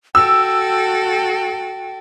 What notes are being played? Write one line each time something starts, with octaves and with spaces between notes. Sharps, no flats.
F#4 A4 G5 E6